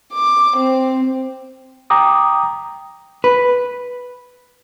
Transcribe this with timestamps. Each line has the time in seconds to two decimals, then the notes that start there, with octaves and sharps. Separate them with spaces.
0.14 D6
0.57 C4
1.90 G5 A#5 D6 D#6
3.24 B4